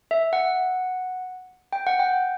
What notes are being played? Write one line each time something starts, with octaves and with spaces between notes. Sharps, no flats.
E5
F#5
G5
F#5
G5